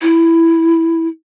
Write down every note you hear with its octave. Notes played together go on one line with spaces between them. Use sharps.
E4